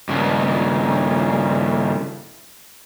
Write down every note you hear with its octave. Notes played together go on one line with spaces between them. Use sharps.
G2 C#3